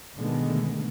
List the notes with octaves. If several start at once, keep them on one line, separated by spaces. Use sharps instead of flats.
B2 D3 D#3 G#3 A3 B3